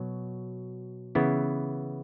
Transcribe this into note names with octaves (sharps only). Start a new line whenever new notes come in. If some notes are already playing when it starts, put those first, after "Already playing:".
Already playing: B2 F#3
C#3 E3 B3 E4